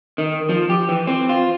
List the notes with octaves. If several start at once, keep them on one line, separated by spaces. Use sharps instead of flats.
D#3
F3
G4
E3
C4
F4